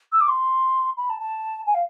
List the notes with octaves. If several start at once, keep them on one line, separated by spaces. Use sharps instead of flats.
E6
D6
C6
B5
A5
A5
G#5
F5